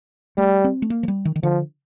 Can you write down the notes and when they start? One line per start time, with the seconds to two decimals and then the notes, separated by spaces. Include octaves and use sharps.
0.38 G3 A3
0.64 C4
0.82 A3
0.90 A#3
1.03 F3
1.08 G3
1.25 D#3
1.36 D#3
1.43 D3 F3